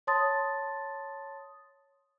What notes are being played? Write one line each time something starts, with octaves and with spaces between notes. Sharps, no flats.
C#5 A5 C6 D#6 A6